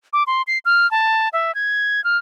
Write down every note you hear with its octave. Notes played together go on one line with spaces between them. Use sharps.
D6
C6
C7
F6
A5
E5
G#6
F6